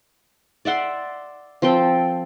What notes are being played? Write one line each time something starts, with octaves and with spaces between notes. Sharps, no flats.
D5 E5 F#5 C6
F3 C4 A4 G5